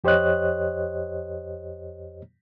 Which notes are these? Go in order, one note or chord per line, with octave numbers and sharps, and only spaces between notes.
F2 G4 C5 C#5 D#5 F#6